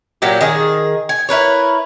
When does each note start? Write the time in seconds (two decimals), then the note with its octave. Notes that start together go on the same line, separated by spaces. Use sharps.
0.22 A#2 F#3 G4
0.41 D#3 G#4
1.09 G#5
1.29 E4 A#4 B4 C#5